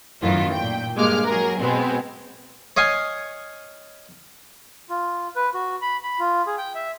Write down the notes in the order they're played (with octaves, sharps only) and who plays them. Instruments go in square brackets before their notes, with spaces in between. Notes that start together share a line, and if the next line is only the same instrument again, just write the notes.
[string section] F#2 A2 D#3 E3 F4
A#2 G5
G2 G#3 A#3 D6 F6
F#3 G#4 A#4
B2 G#3 B3 C4
[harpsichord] C#5 D#5 F5 G#5 C#6
[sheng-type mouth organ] F4
B4
F#4
B5
B5
F4
G#4
G5
E5